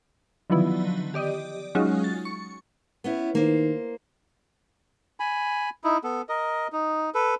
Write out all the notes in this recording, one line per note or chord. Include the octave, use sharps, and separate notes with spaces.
D3 D#3 F3 F#3 B3 E4
G4 D5 D#5
F#3 G#3 C#4 D#4 F4 F#4
A6
C#6
B3 C#4 E4
D#3 A#3 C5
G#5 B5
D#4 E4
B3 A4
A#4 D#5
D#4
A4 B4